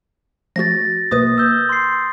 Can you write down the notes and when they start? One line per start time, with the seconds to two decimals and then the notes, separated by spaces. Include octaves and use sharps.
0.56 F3 A3 F#4 A6 A#6
1.11 B1 B2 A#3 B4 D#6
1.38 E6 G6
1.69 C6 C7